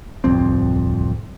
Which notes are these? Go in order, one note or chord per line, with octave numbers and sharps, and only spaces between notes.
D1 C2 F2 C4